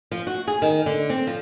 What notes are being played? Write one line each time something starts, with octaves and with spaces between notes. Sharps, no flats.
F3
F#4
G#4
D#3
D3
C4
F3